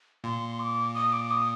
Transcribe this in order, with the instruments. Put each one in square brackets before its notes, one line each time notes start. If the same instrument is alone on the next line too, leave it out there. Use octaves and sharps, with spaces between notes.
[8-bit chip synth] A#2 [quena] C6
[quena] D#6
D6
D#6
D6
D#6